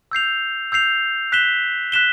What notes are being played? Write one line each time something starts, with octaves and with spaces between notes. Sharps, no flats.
E6 G6 C7 F7
E6 G6 C7 F7
F#6 B6 E7 G7
F#6 B6 E7 G7